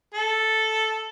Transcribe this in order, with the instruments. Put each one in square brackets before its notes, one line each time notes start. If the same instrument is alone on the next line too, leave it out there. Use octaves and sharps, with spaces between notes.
[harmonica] A4